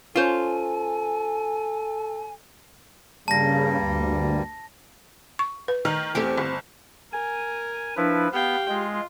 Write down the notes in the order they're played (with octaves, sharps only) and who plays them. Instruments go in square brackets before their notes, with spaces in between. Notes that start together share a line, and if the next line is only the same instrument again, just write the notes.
[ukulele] C#4 C5 C#5 [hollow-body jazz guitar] F4 [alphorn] A4 [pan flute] G#5
[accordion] G2 G3 A#3 [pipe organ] C#3 [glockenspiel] A5 A#6
[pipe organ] D2
[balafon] C#6
B4
[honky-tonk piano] D#3 F6 [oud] D#4
[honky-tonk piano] E2 A3 [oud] C4 G4
[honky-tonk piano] G1
[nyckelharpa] A#4 [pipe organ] G#5
[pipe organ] F3 E4 B4 [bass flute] D4
[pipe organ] B3 [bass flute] G4 [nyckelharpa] F5 G5
[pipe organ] G#3 [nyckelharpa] F4